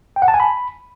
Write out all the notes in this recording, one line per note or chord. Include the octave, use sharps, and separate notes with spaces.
G5
F#5
A5
G#5
B5